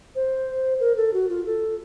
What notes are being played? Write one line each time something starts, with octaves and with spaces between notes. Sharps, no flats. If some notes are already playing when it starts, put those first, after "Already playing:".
C5
A#4
A4
F#4
F4
A4